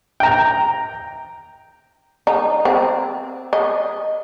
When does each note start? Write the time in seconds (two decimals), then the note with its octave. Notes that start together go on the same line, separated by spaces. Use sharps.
0.20 G5 A#5
2.27 D#4
2.65 C4
3.53 D#5